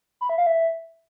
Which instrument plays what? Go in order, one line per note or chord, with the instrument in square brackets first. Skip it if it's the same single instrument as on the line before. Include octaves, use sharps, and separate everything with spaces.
[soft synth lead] B5
E5
F5
E5